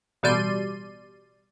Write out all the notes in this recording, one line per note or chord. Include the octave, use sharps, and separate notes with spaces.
A1 B2 G3 D5 C6 D#7